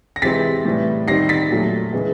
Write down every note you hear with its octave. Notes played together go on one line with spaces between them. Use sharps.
A#6
C3 E3 G#3 C4 E4 A6 B6
A2 E3 G3
D#3 G3 C4 D#4 A#6 C7
A6 B6
A#2 F#3 A3
C#3 E3 G#3 B3